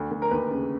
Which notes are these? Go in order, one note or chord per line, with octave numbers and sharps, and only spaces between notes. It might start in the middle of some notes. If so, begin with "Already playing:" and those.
Already playing: D2
D2
A#4
D#2 B4
C#3